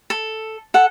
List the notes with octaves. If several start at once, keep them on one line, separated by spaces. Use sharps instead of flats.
A4
A4 F#5